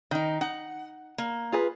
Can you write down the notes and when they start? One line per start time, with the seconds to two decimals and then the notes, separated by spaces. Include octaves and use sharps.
0.11 D#3 D#4 G5
0.41 D#4 F#5
1.18 A#3
1.52 F4 G#4 B4